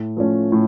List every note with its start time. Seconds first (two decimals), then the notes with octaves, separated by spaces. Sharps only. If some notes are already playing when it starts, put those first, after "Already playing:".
Already playing: A2
0.17 F3 A3 C#4
0.52 A2